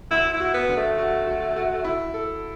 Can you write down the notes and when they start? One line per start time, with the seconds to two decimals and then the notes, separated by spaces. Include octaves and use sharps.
0.11 D2 E4
0.33 E4
0.40 F#4
0.54 B3
0.69 D3
0.76 A3
0.98 F#4
1.27 F#4
1.57 F#4
1.85 E4
2.14 A4